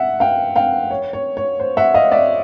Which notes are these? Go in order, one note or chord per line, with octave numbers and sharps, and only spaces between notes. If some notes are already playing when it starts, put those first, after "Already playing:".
Already playing: E5 F#5
F5 G5
F5 G5
C#5
C#5
C#5
C5
E5 F#5
D#5 F5
D5 E5